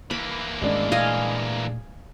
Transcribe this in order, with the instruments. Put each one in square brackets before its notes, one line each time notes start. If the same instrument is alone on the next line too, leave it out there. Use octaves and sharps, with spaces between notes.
[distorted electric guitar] E3 A#3 [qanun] B5
[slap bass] G#1 A3 C#4 [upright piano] G#3 D4
[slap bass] A#2 A3 [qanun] D#5 F5 G#5